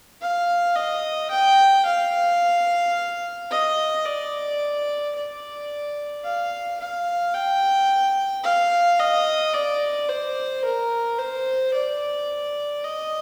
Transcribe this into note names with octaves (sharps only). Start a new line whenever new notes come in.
F5
D#5
G5
F5
D#5
D5
D5
F5
F5
G5
F5
D#5
D5
C5
A#4
C5
D5
D#5